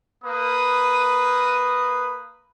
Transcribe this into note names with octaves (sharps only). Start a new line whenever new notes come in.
A#3 B4 D#6